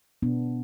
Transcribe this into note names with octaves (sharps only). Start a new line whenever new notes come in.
B2 B3 D4